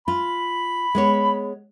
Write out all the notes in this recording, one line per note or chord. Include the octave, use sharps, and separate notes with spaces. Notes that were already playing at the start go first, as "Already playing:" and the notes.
F4 B5
G#3 B3 C#5